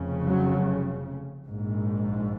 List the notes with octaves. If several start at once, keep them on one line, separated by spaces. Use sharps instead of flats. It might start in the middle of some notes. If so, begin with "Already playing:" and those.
Already playing: F1 F2 C#3
F#3
A#1 G#2